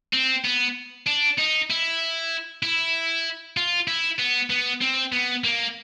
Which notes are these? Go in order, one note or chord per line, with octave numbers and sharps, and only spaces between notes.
C4
B3
D4
D#4
E4
E4
F4
E4
B3
B3
C4
B3
A#3